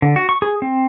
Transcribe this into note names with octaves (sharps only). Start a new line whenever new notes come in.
D3
F#4
C#6
G#4
C4